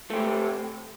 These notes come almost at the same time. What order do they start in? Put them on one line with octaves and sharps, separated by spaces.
A3 C4 G4